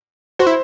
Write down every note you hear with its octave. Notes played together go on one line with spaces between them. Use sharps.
F#4 C5
E4